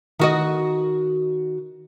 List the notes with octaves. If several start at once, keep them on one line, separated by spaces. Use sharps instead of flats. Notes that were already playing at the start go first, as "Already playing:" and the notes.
D#3 F#4 D#5